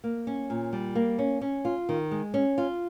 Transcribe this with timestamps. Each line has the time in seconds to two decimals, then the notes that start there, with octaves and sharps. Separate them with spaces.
0.04 A#3
0.27 C#4
0.50 A#2
0.73 G3
0.95 A#3
1.19 C#4
1.41 C#4
1.65 F4
1.89 D#3
2.11 G#3
2.34 C#4
2.58 F4